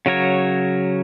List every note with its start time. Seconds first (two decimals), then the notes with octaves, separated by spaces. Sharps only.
0.06 C#3 F#3 A#4 C#5